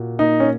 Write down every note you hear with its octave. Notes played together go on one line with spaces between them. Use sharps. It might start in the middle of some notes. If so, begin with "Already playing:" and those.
Already playing: A#2 F#4
A#3 D#4
C#4